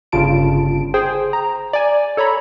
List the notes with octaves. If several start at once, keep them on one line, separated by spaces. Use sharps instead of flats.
G1 C#3 F4 A5 D7
G#4 C5 G5
A#5
D5 G#5
A4 C#5 A#5 B5